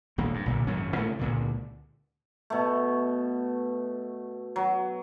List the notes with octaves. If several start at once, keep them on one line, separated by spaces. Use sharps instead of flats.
D#1 D2 A#3
G2
B1 A#2 D3
G#1 F#2 F#3 C#4
A2 C#3 A3 C#4
C#2 A#2 D3
B2 A3
F#3